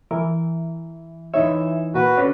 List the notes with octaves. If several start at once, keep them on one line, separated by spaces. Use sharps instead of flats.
E3 A#4
E3 D#4 C#5 E5
A#2 F#4 B4
D3 C#4 D4